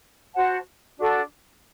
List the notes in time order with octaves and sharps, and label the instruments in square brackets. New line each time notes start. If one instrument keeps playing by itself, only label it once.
[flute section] F#4 C5 F#5 A5
D4 F#4 A4 D5